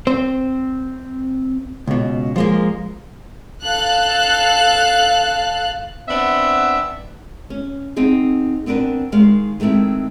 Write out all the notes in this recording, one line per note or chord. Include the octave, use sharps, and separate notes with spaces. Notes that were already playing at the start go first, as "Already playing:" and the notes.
C4 C5
C#2 B2
F3 G#3 A#3
A4 F5 F#6
B3 C4 D4 E5 F#5
C#4
B3 C4 D#4 G#4
B3 C4 D4 A#4 B4
D#3 G#3 F5
D#3 G#3 A3 C4 E4